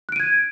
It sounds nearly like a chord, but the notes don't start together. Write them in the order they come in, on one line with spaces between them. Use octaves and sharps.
F#6 D7 D#7 G#6